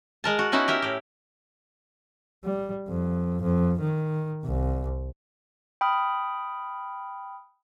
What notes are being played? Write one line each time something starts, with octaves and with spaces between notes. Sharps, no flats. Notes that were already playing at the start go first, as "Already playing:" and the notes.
G#3 A#4 A5
F#4
B3 C#4 D#4 E4 F#4
G4 A#4 E5
A2 G4
G3
F2
F2
D#3
C2
G5 B5 D#6 F6